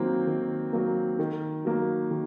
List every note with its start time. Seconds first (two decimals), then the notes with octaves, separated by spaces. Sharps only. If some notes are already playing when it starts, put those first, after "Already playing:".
Already playing: D#3 F#3 A#3 C4
0.27 D#3
0.73 F#3 A#3
1.19 D#3
1.65 F#3 A#3
2.11 D#3